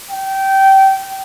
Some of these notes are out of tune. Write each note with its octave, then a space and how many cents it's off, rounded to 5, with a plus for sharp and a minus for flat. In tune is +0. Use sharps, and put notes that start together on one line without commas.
G5 -20